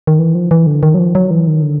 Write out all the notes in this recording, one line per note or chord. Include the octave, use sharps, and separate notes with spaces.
D#3
E3
F3
E3
D3
D#3
F#3
F3
F#3
E3
D#3
D3